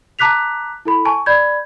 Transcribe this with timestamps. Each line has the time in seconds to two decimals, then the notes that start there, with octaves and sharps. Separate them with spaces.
0.19 A5 A#5 D6 F#6 B6 F7
0.85 E4 A4 B5
1.05 G#5 A5 C#6
1.26 D5 B5 G6 G#6